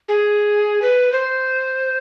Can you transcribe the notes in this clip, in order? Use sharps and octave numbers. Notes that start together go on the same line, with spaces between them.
G#4
B4
C5